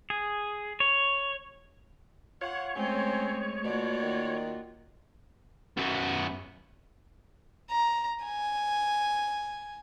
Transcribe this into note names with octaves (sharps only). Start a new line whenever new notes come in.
G#4
C#5
F4 C#5 F#5
G#3 A3 C4 C#4
B2 A#3 F4 F#4 D5
D#3
F#2 B3
A#5
G#5